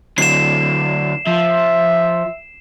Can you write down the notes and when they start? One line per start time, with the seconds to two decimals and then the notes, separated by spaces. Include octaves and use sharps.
0.18 D3 F#3 C7 E7
1.27 F3 E5